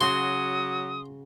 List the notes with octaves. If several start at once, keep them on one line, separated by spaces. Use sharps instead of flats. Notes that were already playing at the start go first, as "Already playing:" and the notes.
C#3 F#3 F#4 C6 D#6